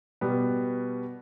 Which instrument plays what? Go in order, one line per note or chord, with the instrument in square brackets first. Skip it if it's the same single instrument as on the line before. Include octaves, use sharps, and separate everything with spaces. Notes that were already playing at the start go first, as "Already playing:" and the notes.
[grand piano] B2 G3 B3